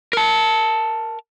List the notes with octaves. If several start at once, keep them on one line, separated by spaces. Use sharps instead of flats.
A#4 A5